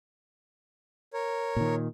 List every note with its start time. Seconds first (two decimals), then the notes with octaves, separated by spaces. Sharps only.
1.14 A#4 C#5
1.56 A#2 D#3